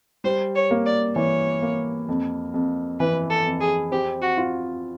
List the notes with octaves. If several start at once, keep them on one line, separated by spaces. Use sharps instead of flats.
G3 C5
C#5
A#3
D5
E3 C#5
A#3
F2
F2
E3 B4
A4
F2
G#4
C4 G4
F#4
F4